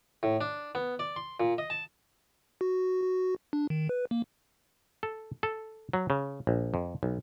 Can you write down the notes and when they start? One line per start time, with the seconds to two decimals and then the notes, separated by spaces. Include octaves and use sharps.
0.23 A2
0.41 D4
0.75 B3
0.99 D5
1.16 C6
1.40 A#2
1.58 D#5
1.70 A5
2.61 F#4
3.02 F#4
3.53 D4
3.70 D#3
3.89 B4
4.11 A#3
5.03 A4
5.43 A4
5.93 F#3
6.10 C#3
6.47 A#1
6.74 F2
7.03 B1